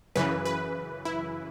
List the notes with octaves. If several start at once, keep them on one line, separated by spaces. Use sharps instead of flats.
F#2 C#3 E3 B4
B4
E4